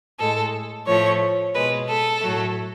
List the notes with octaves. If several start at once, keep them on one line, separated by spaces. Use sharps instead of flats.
A2 G#3 A4
A2 F3 A3 C#5
B2 G#3 B4
A4
A2 F#3 A3